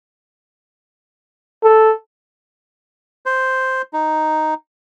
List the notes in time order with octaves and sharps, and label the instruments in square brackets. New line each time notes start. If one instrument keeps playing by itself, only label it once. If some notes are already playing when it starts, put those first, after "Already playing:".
[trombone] A4
[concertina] C5
D#4